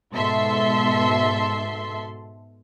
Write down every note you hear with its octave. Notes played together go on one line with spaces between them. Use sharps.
G#2 B2 A4 E5 C6